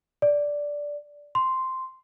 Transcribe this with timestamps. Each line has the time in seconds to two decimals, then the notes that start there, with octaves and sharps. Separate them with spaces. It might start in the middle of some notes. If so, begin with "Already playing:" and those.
0.22 D5
1.35 C6